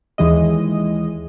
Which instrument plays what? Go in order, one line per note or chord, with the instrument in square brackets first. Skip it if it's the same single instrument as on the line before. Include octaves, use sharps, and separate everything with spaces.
[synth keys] D#2 E3 G#3 D#5